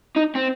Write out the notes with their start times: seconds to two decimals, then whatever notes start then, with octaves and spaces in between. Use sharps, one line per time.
0.17 D#4
0.35 C4